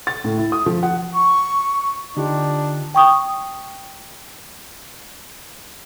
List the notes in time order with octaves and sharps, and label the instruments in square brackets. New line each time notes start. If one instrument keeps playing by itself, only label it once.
[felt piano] A6
A2
E4
D#6
F3
F#5
[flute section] C#6
[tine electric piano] D3 F4 [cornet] D4 [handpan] D#4 G4
[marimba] G5 C#6 D#6